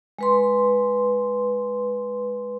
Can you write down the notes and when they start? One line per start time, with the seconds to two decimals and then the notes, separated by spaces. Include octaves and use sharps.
0.19 G#3 B4 C6